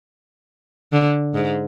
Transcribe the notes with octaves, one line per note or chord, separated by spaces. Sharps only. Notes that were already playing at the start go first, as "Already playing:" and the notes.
D3
G#2